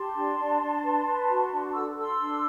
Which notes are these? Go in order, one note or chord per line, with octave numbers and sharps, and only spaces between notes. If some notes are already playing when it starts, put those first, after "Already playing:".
Already playing: G4 A5 C6
D4
D4
D4
B4
B4
F#4
D4
A4 E6
A4 C6 E6
D4